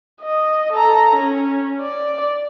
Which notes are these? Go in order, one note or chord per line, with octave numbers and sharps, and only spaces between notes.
D#5
A4 A#5
C#4
D5